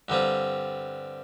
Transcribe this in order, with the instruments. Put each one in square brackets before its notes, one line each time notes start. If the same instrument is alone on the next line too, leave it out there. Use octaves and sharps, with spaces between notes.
[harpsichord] G2 D3 G3 C4 F4